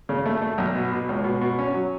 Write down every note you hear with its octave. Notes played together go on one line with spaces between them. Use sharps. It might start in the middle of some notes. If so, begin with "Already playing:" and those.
C#3
A3
A3
B1
B2
B2
C#2
B2
B2
C#4
F#3